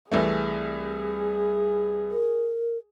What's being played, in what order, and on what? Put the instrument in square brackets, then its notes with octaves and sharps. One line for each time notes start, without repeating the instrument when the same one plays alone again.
[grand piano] C2 E3 A3 [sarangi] G#4
[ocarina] A#4